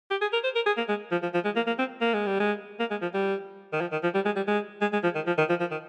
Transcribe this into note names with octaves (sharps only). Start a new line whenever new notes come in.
G4
G#4
A#4
C5
A#4
G#4
A#3
G#3
F3
F3
F3
G#3
A#3
A#3
C4
A#3
G#3
G3
G#3
A#3
G#3
F3
G3
D#3
F3
D#3
F3
G3
G#3
G3
G#3
G#3
G#3
F3
D#3
F3
D#3
F3
F3
D#3